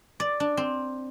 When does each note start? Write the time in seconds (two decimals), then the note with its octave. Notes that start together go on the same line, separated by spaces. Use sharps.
0.20 D5
0.40 D4
0.57 C4